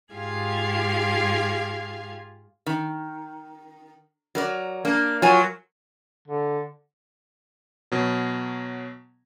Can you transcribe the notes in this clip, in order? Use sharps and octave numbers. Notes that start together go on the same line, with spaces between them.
G#2 F4 G4 G#4 F5 G#6
D#3
F#3 A#4 D5
A#3 D4
F#3 F4 G#5
D3
B2 F#3